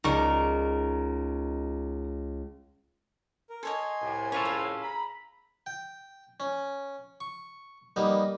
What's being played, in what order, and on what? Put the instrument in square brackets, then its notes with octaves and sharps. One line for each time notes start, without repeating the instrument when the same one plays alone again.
[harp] C#2 D5 C#6 [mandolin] D#4 A#4
[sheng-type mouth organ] A#4
[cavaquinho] A4 C#5 D#5 [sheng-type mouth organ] G#5 C6
[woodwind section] C2 A2
[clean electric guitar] C#4 F4 A4 [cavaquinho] C#5
[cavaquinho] G#4
[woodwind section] A#5 B5
[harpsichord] G5
C#4
C#6
G3 A#3 B3 D#4